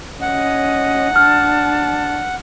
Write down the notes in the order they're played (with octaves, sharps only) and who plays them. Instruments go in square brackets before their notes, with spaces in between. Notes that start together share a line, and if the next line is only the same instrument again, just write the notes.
[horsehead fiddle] C#4 D#5 [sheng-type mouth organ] F#5
[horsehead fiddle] D4 A5 [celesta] F6